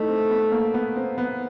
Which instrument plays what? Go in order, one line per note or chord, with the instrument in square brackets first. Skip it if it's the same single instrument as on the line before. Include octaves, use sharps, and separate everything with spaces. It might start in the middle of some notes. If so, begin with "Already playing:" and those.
Already playing: [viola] A3 [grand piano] D#4 E4
[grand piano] C4
B3
A#3
B3
C4
B3